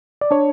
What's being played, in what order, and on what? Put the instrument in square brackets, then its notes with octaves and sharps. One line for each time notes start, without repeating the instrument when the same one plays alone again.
[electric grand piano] D5
[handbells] D4 [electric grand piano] C#5